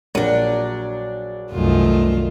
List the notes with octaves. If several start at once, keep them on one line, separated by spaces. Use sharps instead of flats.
A#1 F#3 D4 A#4
C2 F#2 D#3 A3 F4